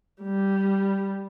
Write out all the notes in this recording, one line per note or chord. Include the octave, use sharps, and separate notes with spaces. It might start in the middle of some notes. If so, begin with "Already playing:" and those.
G3